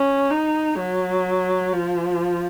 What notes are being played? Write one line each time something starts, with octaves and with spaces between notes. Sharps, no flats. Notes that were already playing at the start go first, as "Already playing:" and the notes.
Already playing: C#4
D#4
F#3
F3